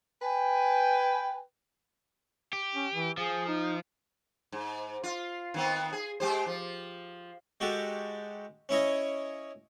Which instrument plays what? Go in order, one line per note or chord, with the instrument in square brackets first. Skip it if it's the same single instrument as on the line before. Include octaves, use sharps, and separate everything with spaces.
[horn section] B4 G5 G#5
[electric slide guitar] G4
[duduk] C#4
E3
[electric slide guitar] F3 [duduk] G#4
[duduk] D#4
[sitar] G#2
F4
D#3 B3 C4
G#4
G#3 G4 C5
F3
[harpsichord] G#3 F#4 G4 A4
C#4 E4 C#5 D#5